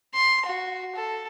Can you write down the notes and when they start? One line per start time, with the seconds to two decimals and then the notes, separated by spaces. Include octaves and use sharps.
0.14 C6
0.45 F#4
0.95 A4